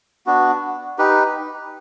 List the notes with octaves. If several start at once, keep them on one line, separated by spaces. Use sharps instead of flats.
B3 D4 F#4
D#4 G4 B4